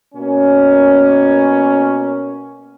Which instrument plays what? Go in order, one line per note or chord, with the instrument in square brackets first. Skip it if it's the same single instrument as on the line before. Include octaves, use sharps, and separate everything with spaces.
[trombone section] B2 A#3 C#4